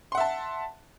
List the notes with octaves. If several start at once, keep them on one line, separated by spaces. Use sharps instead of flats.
E5 F#5 A5 C6